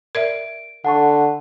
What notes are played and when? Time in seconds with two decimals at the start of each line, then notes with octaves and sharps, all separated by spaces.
0.15 A#4 D5 E5 D7
0.85 D3 F#5 A5 C#6